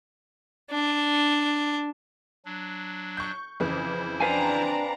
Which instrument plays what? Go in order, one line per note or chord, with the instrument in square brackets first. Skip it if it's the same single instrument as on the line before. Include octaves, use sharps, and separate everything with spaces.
[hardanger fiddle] D4
[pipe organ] F#3 D4
[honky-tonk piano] C#6 G6
[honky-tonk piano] F2 C#3 E3 [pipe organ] E4 C5
[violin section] C4 D4 A#5 [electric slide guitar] B4 F5 G#5